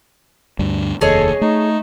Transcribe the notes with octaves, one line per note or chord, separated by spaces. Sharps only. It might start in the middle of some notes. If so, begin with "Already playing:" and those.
D2 G2 D3
F1 D#2 G#4 A4 C#5 D#5
A3 D#4